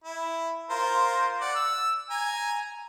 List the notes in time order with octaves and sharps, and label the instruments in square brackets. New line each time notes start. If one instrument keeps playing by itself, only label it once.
[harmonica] E4
F4 A#4 C5
D5 F#5
E6
G#5 A#5